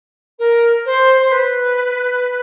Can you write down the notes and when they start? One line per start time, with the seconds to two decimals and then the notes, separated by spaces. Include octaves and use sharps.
0.39 A#4
0.85 C5
1.20 C5
1.31 B4